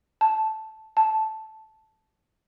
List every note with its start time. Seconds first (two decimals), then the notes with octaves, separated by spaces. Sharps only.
0.21 A5
0.97 A5